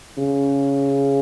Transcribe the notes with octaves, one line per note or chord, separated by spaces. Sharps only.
C#3